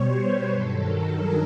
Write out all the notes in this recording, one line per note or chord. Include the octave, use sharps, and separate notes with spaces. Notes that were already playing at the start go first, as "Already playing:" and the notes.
Already playing: B2 G3 C5 C#5
B4
G2 D#3 F#3 A4
A#4
G#4